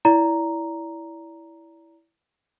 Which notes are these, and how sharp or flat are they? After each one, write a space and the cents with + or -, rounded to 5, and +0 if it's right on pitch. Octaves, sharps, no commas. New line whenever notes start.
E4 +0 D5 -30 A#5 +0